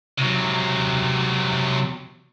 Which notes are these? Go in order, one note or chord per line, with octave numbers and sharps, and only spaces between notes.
C3 F#3